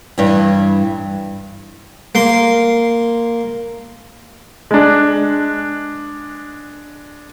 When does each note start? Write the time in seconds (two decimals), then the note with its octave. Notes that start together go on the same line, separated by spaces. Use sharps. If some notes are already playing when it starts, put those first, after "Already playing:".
0.18 G2 E3
2.15 A#3 C6
4.71 G#3 D4